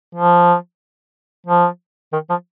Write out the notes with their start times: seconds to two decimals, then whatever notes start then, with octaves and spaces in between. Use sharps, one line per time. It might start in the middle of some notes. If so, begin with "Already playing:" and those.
0.15 F3
1.46 F3
2.13 D#3
2.30 F3